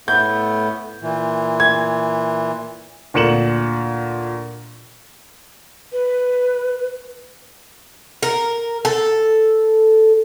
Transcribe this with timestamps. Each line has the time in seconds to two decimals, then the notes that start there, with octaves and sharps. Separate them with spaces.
0.08 A2 A3 B3 G6
1.02 A#2 E3
1.60 G#6
3.14 D2 A#2 C#7 E7 F#7
5.92 B4
8.23 A#4
8.85 A4